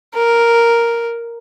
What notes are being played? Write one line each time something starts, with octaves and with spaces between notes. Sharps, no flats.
A#4